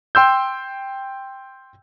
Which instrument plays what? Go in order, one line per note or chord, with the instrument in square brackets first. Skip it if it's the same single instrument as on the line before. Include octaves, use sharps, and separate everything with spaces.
[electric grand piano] G5 C6 E6 G6